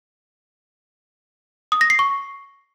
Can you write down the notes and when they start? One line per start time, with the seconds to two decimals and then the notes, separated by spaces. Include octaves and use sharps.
1.72 D#6
1.81 A#6
1.90 C7
1.99 C#6